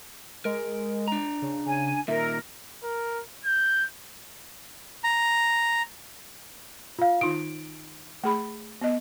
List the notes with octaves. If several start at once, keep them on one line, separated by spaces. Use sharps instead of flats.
G#3 A#4
D4 A#5
C#3
C#3 G#5
A#2 D#3 A#4 E5
A#4
G6
A#5
F4 F5
D#3 D#4 F4 D7
A3 G#4 B5
B3 D#5